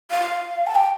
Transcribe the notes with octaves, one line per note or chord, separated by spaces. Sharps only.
F5
A5
G5